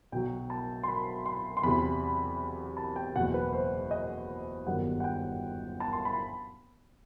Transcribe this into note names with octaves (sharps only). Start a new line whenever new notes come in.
B1 B2 F#3 G5
A5
C6
B5
C6
C6
E2 C3 F#3 B5
A5
G5
F#1 E2 B2 F#5
B4
C5
D#5
G1 F#2 D#3 G3 F#5
F#5
G5
A5
C6
B5